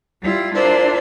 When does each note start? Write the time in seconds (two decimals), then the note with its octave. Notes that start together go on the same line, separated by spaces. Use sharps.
0.20 G3 E4 F4
0.54 D4 E4 F4 A#4 C5 D5